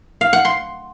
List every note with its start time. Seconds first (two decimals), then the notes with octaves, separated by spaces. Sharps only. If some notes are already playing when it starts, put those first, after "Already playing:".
0.21 F5
0.33 F#5
0.45 C6